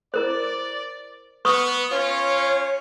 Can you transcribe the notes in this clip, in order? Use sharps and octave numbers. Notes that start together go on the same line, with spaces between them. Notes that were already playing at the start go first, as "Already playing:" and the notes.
E4 A#4 C5 D5
B3 B4 C#6 D#6
C#4 F4 C#5